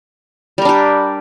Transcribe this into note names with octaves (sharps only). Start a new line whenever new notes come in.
G3 D4 G4 A#4